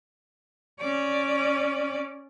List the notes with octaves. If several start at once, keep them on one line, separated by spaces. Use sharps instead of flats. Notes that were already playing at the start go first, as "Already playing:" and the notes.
C#4 D5